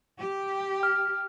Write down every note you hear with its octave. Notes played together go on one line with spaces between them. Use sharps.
G4
F6